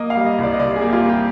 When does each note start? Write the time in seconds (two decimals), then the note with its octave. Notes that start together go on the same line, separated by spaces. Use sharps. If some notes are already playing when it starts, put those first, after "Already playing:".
Already playing: A#3 D#5
0.10 F5
0.16 G3
0.26 D#5
0.38 C2 D5
0.54 D#5
0.60 C3 D5
0.76 G#4
0.81 A#3
0.88 G4
0.93 F4
1.04 G3 G4